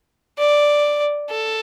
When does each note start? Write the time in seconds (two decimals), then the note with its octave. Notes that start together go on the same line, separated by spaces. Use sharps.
0.38 D5
1.30 A4